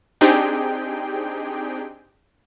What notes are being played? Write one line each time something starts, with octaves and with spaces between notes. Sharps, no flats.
C4 D4 D#4 G4 G#4 G5